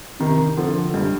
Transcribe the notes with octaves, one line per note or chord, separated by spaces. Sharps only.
C3 D#3
D3 F3
G2